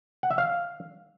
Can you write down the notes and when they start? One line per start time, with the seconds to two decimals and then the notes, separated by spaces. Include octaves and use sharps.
0.23 F#5
0.31 E5
0.38 F5